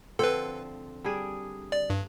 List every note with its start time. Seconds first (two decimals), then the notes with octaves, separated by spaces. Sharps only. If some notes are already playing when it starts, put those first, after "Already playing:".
0.19 D3 F3 C4 A4 B4
1.04 G3 D4 G#4
1.72 D5
1.90 G2